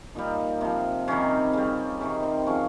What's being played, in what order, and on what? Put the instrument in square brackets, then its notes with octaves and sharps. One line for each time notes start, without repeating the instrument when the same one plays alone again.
[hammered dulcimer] A#2 G3 D#4
C3 F3
C3 D#3 G3 C#4
C#3 G3
C3 D#3 G3 C#4
C4
C#3 F3 C#4